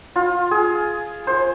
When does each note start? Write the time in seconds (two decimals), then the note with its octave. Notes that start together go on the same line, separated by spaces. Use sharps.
0.16 F4
0.51 G#4
1.27 C5